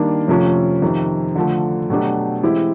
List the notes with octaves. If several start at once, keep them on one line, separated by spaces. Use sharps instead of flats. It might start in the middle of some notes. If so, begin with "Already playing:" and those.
Already playing: D#3 G3 A#3 D4
F2 C3 F3 A3 C#4
F2 C3 D#3
D3 F3 A3
B2 F#3 A3 D4 G4
E3 G#3 C4 E4 G4